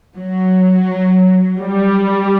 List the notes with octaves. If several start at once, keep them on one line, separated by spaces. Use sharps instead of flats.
F#3
G3